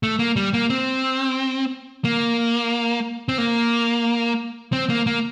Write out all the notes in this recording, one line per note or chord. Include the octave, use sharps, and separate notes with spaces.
A3
A#3
G3
A#3
C4
A#3
C4
A#3
C4
A#3
A#3